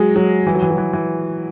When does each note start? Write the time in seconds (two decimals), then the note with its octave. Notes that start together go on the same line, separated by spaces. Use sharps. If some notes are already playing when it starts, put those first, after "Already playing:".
Already playing: F#3 G#3
0.16 F#3
0.47 E3
0.54 F#3
0.62 E3
0.70 F#3
0.78 E3
0.93 E3